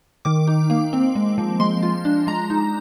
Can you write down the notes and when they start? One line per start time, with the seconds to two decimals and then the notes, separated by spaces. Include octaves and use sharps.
0.25 D#3 D6
0.47 D#4
0.70 A#3
0.93 C4
1.15 G#3
1.38 F3
1.60 G#3 C6
1.83 F4
2.05 D4
2.27 G#3 A#5
2.50 D#4